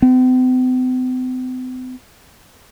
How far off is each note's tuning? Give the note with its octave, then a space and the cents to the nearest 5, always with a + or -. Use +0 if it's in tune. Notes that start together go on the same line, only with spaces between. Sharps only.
C4 -45